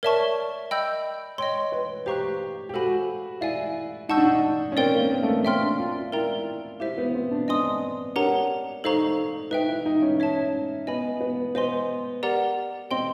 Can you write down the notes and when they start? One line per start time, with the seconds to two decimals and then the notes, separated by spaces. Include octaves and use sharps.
0.03 A#4 C#5 D5 E5 A5 C#6
0.71 D#5 G5 B5 E6 G6
1.38 C#5 D#5 G5 C6
1.72 B4
2.06 G4 C5 F5 A#5 C#6 F#6
2.69 G4
2.74 F#4 A4 C5 F5 G#5 B5
3.41 E4 D5 F5 G#5
4.09 D#4 F#5 A5 C#6 E6 G6
4.17 D4
4.25 D#4
4.72 C#4
4.77 C4 A#4 D5 G5
4.94 A#3
5.11 B3
5.23 A3
5.28 A#3
5.45 C#4 E5 G5 C6 F6
5.61 D4
5.79 F4
6.12 E4 A#4 D5 G5 A#5
6.80 E4 G4 C5 E5
6.98 B3
7.15 C4
7.31 D4
7.48 D4 D#5 G#5 C6 D#6
8.16 D4 G4 A#4 C#5 F#5 A#5
8.84 D#4 A4 C5 F5 A#5 C#6
9.51 D#4 B4 E5 G5
9.68 E4
9.86 D#4
10.02 C#4
10.20 C#5 E5 A5
10.87 B3 D#5 G#5 B5
11.21 B3
11.55 B3 C5 D#5 G#5 C6
12.23 G4 A#4 D5 F#5 A#5
12.91 C4 D#5 G5 C6